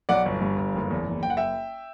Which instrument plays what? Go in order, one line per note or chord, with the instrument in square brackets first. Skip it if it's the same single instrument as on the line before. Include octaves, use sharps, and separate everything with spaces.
[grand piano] B1 D5 F#5
G1
G2
G1
F#1
E2
F#1
F#1 G5
F#5
E5 G5